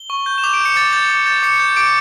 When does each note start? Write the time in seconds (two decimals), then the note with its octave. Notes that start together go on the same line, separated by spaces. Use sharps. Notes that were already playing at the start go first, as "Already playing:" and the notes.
Already playing: G7
0.10 C#6
0.26 G6
0.38 E7
0.44 D6 F7
0.54 D7
0.60 G6
0.65 C#7
0.76 D6 A6
0.93 G6 A6
1.10 D6
1.26 G6 A6
1.43 D6 C#7
1.59 G6
1.76 D6 D7